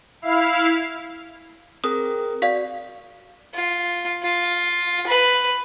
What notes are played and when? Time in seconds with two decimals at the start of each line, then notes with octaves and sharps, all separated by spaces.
0.22 E4 F5
1.84 C4 G#4 A#4 D#6
2.42 F#4 D5 F5 B6
3.54 F4
4.23 F4
5.07 B4